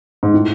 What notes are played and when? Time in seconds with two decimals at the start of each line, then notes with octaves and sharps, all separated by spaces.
0.23 G#2
0.34 A2